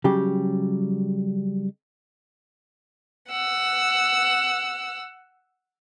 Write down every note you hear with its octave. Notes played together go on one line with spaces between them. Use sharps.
C#3 F#3 G3 G4
F#5 E6